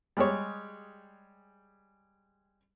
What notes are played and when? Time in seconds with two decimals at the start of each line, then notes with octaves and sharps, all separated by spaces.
0.17 G3 G#3 G4 G#4 C#5